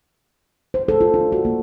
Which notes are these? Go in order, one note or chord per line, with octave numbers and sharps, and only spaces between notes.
C5
A4
F4
D4
F#4
A#3